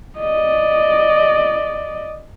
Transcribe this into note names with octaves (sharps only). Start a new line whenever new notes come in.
D5 D#5